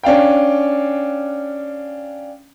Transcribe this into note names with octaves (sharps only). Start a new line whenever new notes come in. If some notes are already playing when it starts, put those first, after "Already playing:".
C#4 D4 F5 G5